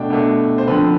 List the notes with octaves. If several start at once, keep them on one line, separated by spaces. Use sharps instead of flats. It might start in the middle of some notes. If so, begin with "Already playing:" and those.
Already playing: B2 A3 D4 G5
B2 A3 D4
C5
D3 F3 C4 B4